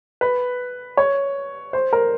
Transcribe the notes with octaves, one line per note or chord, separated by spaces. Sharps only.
B4
C#5
C5
A#4